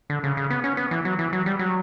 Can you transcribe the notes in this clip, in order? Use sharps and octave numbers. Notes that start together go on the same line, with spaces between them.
D3
C#3
C#3
B3
C#4
B3
E3
F#3
E3
F#3
G3
F#3